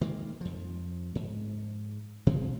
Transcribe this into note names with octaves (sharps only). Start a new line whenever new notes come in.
D#3 G#3 A#3
F2 F3
G#2
B2 F3 G#3 C4